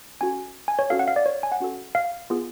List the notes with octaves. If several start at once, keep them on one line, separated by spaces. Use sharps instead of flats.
C#4 F#4 A4 G#5
G#5
C#5
C#4 F#4 A4 F5
F#5
F5
D5
C#5
G#5
F#5
C#4 F#4 A4
F5
B3 F4 G#4